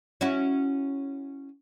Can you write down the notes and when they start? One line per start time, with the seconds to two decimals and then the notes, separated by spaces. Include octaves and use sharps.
0.21 C#4 E4 F#4